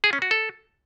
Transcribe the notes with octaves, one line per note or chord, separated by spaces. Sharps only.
G#4
C#4
F#4
A4